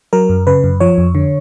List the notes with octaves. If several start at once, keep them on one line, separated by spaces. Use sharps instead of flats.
F#3 A#4
F#2
C#3 B4
F#2
F3 C#5
F2
D3